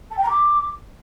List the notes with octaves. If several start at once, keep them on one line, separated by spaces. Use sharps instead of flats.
A5
G5
A#5
D6